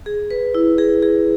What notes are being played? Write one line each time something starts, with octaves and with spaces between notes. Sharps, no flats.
G#4
B4
E4
G#4
G#4